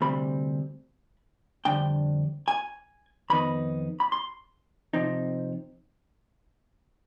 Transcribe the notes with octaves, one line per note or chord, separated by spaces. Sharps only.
D2 C3 G3 C4 B5
F2 D3 G3 D4 G5
G#5
F2 D#3 B3 D#4 B5
B5
C6
C3 F3 C4 D#4